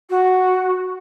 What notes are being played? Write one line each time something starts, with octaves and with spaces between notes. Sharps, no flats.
F#4